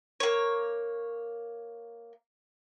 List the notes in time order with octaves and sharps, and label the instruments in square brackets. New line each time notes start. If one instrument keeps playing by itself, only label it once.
[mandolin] A#3 C#5